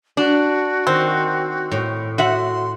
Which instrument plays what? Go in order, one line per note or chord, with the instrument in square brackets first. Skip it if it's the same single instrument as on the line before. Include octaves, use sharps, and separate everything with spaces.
[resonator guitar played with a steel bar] D4 [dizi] F#4 [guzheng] C6
[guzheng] D#3 [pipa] C4
[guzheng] A2
[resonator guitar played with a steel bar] F#4 E5 F#5 [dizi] C6